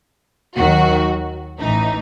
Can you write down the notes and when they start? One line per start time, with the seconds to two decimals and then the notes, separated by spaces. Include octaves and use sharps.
0.57 D#2 D#3 F#3 F#4
1.60 A1 A2 E3 D#4